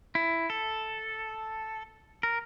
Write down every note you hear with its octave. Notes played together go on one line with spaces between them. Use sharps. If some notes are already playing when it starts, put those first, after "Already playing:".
E4
A4
A#4